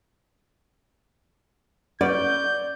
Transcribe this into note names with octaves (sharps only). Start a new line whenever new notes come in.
C#4 B4 D5 F#5 G6